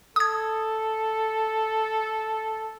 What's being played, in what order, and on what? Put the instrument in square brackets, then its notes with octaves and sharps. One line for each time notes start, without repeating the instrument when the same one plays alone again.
[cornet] A4 [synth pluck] D#6 G#6